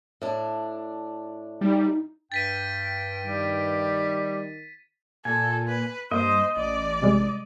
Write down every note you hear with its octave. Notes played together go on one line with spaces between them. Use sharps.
A2 D4
G3 D#4
G2 G5 A6 B6 D#7
D#3 G3
A#2 A4 G#5
B4
G2 A#3 C5 D#5
A1 D5
C3 G3 G#3